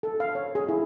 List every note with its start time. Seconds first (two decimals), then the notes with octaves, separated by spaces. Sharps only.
0.03 A4
0.20 F5
0.35 C#5
0.55 G#4
0.69 E4